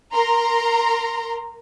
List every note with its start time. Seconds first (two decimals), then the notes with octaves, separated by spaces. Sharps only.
0.14 A#4 A#5 C6